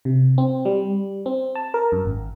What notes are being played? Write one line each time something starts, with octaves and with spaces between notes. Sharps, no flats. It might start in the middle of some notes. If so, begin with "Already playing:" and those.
C3
C4
G3
C4
A5
A#4
F#2
G#1